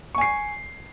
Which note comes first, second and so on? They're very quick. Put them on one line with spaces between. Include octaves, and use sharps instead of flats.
C#6 G#5 C7